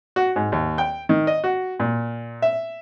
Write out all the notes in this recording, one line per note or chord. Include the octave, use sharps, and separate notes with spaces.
F#4
G#2
D#2
G5
D#3
D#5
F#4
A#2
E5